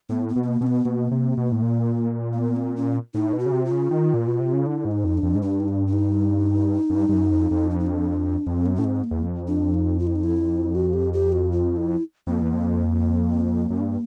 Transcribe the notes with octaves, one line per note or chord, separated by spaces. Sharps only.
A2 B3
B3
B2
B3
A#3
B2 C4
B3
B2 A#3
C3
B2
A2
A#2
A#3
B3
C4
C#4
A2 D#4
B2
F#4
C#3
C3
F4
C#3
D#3
A#2
B2
C3
C#3
D3 E4
G#2
D#4
F2
D4
F2
G#2
G2 D4
D#4
D4
D4
D#4
F#2
G2
G2
F#2
F2
F2
D4
D#4
D4
F2 C4
F#2 B3
A2 C#4
G#2 C4
A#3
E2
F2
D4
D#4
F4
E4
D#4
E4
F#4
G4
G4
F#4
F4
E4
F2 A#3
E2
F2
F#2
G2